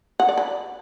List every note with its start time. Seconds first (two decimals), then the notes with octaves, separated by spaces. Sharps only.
0.20 F#5
0.29 D5
0.38 B5